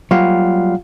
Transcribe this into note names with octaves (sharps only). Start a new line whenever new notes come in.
F#3 G3 A#3 F4 F5 F#5